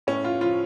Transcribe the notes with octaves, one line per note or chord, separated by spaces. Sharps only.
A2 C#4
F4
F3 F4